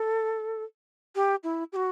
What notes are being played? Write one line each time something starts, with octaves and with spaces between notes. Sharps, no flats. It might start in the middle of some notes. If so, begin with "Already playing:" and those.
Already playing: A4
G4
E4
G4
F#4